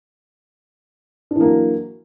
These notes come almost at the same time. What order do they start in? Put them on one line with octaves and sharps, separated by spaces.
D4 E3 A#3 F#3